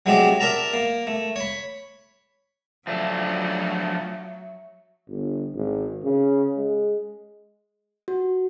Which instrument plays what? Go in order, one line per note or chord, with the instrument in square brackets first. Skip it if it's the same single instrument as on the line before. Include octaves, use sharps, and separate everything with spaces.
[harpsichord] F#3 G#3 A3 C4 G4 D5
A#4 D5 E5 A5 A#5
A#3
A3
C#5 B5
[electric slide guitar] F3 A3 D4 [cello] F#3 [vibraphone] E5
[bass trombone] G1
G#1
C#3
G#3
[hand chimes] F#4